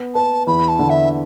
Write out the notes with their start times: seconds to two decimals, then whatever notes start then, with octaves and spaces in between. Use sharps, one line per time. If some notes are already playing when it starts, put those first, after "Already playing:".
Already playing: B3
0.15 B4 A5
0.47 E2 B5
0.68 A5
0.79 D3
0.90 E5